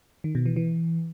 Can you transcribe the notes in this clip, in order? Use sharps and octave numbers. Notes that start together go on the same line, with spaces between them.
D#3
B2
E3
E3